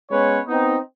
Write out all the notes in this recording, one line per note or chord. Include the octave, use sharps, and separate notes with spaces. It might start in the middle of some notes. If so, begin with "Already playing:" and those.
G#3 B3 C#4 B4 C#5
B3 C4 D#4